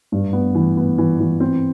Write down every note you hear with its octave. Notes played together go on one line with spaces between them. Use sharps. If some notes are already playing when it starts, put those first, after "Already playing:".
G2
B3
E3
B3
E3
E3
C4